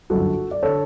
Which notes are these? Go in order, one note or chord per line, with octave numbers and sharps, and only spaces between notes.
G1 F#2 D3 F#4 A4
D5
D3 A4 C#5